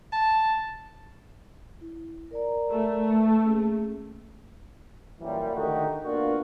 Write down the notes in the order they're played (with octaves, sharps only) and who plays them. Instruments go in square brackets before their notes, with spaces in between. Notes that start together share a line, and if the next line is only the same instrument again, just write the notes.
[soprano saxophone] A5
[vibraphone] E4
A#4 D5 A#5
[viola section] A3
[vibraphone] B4 A5
A#3 C#4 G#4
[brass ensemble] F#2 A#2 E3 F#3 G3
D3 D#3 A3 D#4 F#4 G4
A#3 B3 D4 F4 F#4 F5